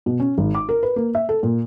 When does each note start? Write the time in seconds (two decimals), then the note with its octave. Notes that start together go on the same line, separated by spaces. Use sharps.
0.06 B2
0.20 C#4
0.38 G#1
0.55 D6
0.69 A#4
0.83 B4
0.96 A#3
1.15 E5
1.29 A4
1.43 A#2